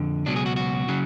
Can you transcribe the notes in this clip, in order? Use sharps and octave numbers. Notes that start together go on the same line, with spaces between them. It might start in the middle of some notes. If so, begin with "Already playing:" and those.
Already playing: F2 D3
C#2 B2 F#3 D4
G#4
F#4
F#4
C#3 F#3